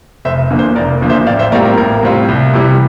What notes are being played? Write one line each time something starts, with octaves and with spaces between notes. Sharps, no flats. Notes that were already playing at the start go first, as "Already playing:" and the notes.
F1 C5 E5
E2 D3 F3 A#3
C5
F1 A#4 D5
E2 D3 F3 A#3
C5 E5
A1 D5 F5
C5 E5
A2 G3 C4 F4 A#4 D5
A#4
A1 A#4
A2 G3 C4 F4
C2
C3 E3 G3